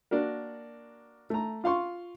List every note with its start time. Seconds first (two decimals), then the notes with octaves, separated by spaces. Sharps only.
0.11 A#3 D4 F#4 A#4
1.30 A3 A#5
1.64 F4 F5 C6 C#6